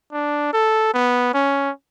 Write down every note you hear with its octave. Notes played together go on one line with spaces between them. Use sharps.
D4
A4
B3
C#4